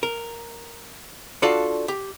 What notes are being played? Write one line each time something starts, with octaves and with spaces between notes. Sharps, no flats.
A#4
D4 F4 F#4 A4 D5 F5
G4